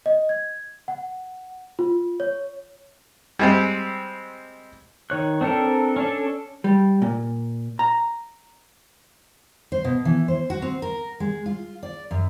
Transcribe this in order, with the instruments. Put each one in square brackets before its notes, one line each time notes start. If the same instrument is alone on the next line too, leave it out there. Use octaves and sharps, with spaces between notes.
[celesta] D#5
G#6
F#5
F4
C#5
[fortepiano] G3 G#3 C4
[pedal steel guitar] D#3 C#5 F#6
C4 D4 E4 A4 A#4
C#4 D4 A4
[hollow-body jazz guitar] G3
A#2
A#5
[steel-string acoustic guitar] C5
B2
E3
C5
F#4
C4
A#4
G#3
F4
D5
F#2